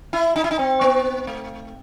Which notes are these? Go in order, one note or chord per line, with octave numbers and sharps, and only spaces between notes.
E4
D#4
E4
D#4
C4
B3
A3